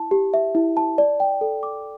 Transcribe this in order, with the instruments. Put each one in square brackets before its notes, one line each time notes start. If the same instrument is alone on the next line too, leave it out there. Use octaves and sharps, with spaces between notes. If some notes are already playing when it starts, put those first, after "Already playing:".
Already playing: [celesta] E4 A5
G4
E5
E4
A5
D5
G5
A4
D6